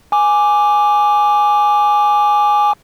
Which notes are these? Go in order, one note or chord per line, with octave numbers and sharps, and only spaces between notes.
G#5 D6